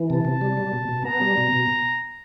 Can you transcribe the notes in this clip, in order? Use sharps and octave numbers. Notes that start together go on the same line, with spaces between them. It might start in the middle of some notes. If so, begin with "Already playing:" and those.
Already playing: E3
C3 A5
C3
G3
G3
B2
B2
B3 A#5
G3
B2
B2